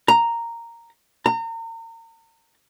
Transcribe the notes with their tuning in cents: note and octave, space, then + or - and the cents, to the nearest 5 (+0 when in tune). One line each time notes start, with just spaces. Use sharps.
A#5 -5
A#5 -35